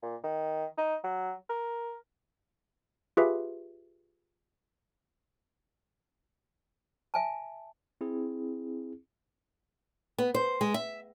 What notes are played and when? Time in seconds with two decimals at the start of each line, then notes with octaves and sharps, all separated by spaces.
0.03 A#2
0.24 D#3
0.78 D#4
1.04 F#3
1.49 A#4
3.17 F4 G4 G#4 B4 E5
7.14 E5 G#5 A5
8.01 C4 E4 G#4
10.18 B3
10.34 C5
10.61 G#3
10.74 E5